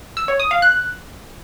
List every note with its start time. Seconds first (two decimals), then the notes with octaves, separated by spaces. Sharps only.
0.17 E6
0.28 C#5
0.40 D#6
0.51 F5
0.62 F#6